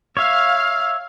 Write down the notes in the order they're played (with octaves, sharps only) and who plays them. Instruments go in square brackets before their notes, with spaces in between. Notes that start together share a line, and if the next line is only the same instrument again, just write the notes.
[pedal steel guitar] C#5 E5 [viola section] F5